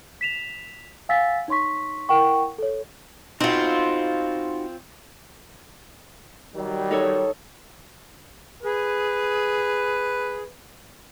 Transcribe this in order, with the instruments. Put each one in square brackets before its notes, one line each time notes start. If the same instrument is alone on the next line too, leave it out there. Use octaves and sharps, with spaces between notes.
[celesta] B6 E7 F7
F5 F#5 G#5 E6 A6 B6
D#4 C#5 C6 C#6 B6
E4 A#4 F#5 G5 C#6
A4 C#5
[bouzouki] C4 F4 [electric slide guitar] D#4 F#4
[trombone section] D#3 F#3 G3
[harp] D#4 A4 C#5
[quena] G#4 [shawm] B4